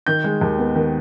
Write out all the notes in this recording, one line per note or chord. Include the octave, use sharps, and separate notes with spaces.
D#3 G6
G#3
D#2
B3
D#3